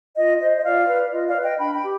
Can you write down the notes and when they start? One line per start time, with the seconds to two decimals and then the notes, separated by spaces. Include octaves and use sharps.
0.17 F4 D#5
0.40 C5 D#5
0.57 D#5
0.64 F4 D5 F5
0.87 B4
1.11 F4 D#5
1.27 D5 F5
1.35 B4
1.43 D#5 G5
1.59 D4 G5 B5
1.74 G5 B5
1.82 G4